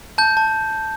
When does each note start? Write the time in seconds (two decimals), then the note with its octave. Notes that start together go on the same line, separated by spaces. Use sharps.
0.18 A5 G6
0.37 A5